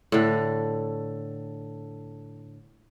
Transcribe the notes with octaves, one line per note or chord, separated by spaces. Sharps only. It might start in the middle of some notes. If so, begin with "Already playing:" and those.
A2 D3